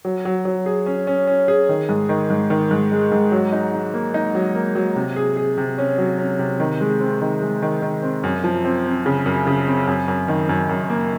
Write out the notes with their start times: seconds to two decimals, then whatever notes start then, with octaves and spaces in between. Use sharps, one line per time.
0.05 F#3
0.25 F#3
0.45 F#3
0.66 G#4
0.86 C#4
1.07 C#4
1.27 C#4
1.48 G#4
1.69 D#3
1.89 G#2
2.09 D#3
2.30 G#2
2.50 D#3
2.71 G#2
2.92 G#3
3.12 G#2
3.32 F#3
3.52 D#4
3.73 D#4
3.94 A#3
4.14 D#4
4.35 F#3
4.55 A#3
4.75 F#3
4.96 C3
5.16 G#4
5.37 G#4
5.57 C3
5.78 C#4
5.98 F#3
6.18 C#4
6.39 C3
6.60 D#3
6.81 G#3
7.00 C4
7.21 D#3
7.42 G#3
7.62 D#3
7.82 D#3
8.03 C4
8.24 F#2
8.44 F3
8.64 C4
8.86 C4
9.06 C#3
9.26 F#2
9.47 C#3
9.67 C4
9.87 F#2
10.08 F#2
10.28 D#3
10.49 F#2
10.69 F#2
10.90 A#3